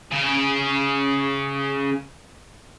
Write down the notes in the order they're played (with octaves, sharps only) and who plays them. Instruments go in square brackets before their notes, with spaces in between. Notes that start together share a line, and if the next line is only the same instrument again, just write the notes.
[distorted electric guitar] C#3 G#4